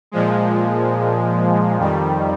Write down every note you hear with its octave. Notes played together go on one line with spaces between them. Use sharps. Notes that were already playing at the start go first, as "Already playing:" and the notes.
A#2 F3 G#3
F2 D#3 G3